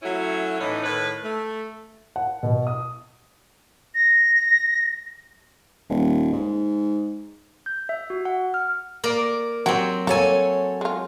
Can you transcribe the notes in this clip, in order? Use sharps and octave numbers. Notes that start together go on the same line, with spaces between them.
F#3 A3 C#4 E4 F#4
A2 E3 C#4 D#4
A2 D#3 B4
A3
F#5
B2
D#6
A#6
D#1
G#2
G6
E5
F#4
F#5
F6
A#3 A#4 D5
F#3 C4 F#4 G4
A#3 A4 C#5 G#5
G#3 F4